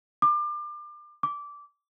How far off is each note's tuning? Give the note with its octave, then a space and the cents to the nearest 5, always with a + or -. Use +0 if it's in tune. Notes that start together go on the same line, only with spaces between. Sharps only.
D6 +30
D6 -15